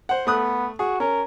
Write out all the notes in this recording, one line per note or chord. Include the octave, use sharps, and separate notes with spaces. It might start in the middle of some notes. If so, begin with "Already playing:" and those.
C5 F#5
A3 B3 D#6 F#6
F#4 G#4
C#4 A#4